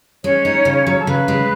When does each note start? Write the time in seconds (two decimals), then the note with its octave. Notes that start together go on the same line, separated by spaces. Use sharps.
0.24 G#3 C#4 C#5
0.45 D#4
0.65 C#3
0.87 F#3
0.97 A4
1.07 C#3 B4
1.28 G#3